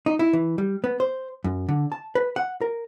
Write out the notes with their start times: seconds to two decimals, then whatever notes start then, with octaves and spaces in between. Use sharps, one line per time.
0.06 D#4
0.19 E4
0.33 E3
0.58 G3
0.84 B3
1.00 C5
1.44 F#2
1.69 D3
1.92 A5
2.15 B4
2.36 F#5
2.61 A#4